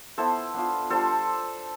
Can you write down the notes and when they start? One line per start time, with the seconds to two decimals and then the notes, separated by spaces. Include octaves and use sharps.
0.18 B3 E4 A4 C5
0.54 B3 D4 F4
0.90 G3 D4 F4 A4 C5